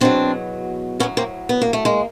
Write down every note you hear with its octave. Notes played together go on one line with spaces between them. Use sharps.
E2 B2 F#3 C4 D4
A2 F#3 B3 C#4
A#3 C4
B3
A#3
A3
G#3 A#3